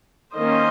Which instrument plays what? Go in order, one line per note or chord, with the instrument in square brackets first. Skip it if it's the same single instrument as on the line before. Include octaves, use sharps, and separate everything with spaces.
[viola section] D#3 A#3 C#4 C5 D#5